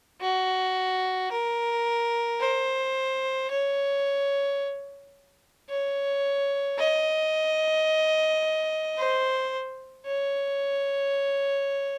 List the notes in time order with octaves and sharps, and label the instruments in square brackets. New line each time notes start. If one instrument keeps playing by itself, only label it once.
[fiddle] F#4
A#4
C5
C#5
C#5
D#5
C5
C#5